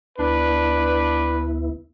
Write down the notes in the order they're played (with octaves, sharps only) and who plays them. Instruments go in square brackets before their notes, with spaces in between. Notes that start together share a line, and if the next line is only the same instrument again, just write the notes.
[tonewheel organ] D2 B3 E4 [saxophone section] D4 [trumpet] B4